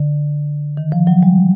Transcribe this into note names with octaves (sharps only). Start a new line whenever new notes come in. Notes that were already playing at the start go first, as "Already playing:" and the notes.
Already playing: D3
D#3
F3
F#3
G3